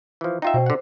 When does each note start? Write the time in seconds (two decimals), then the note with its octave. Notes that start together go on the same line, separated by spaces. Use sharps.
0.21 E3 F3
0.42 D#4 F4 E5 G5
0.54 B2 C5
0.66 D3 F#5